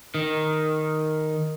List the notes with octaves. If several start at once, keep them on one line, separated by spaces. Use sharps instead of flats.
D#3